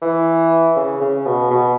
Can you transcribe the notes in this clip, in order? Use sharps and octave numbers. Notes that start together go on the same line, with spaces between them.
E3
C#3
C#3
B2
B2